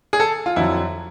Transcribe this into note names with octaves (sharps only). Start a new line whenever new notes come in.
G#4
A4
F4
F2 D3 F#3 E4